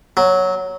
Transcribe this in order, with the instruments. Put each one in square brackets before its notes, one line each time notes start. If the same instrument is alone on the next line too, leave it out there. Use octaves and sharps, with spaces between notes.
[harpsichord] F#3